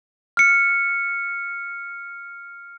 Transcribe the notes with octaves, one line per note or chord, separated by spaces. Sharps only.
F6 C#7